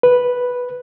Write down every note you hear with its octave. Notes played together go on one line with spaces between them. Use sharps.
B4